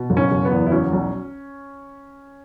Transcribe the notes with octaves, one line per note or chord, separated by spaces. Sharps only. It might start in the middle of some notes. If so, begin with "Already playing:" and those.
Already playing: B2
F#1
C#4
F#1
B3
E2
E4
F#3 C#4
B1